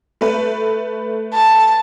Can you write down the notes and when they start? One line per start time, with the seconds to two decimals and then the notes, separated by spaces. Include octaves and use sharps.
0.21 A3 B4
1.34 A5